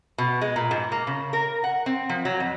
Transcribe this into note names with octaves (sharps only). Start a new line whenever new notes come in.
B2
G#3
A#2
G#2
A#3
C#3
A#4
F#5
C4
F3
F#3
F2